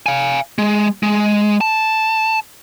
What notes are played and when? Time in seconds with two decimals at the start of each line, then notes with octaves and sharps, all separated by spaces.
0.06 F5 G#5
0.58 G#3
1.03 G#3
1.61 A5